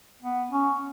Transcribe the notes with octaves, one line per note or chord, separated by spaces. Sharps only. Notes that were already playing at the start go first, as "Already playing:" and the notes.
B3
C#4